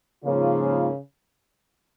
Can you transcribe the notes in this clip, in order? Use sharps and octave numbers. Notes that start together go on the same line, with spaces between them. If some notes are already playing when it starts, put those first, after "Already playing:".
G#2 C#3 F3 A#3 C#4 F4